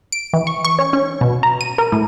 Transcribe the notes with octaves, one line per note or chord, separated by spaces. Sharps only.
D7
E3
C#6
C#6
C#4
C#4
B2
A#5
D#7
A#4
A2